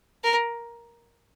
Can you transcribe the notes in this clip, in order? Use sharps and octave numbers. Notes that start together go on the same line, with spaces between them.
A#4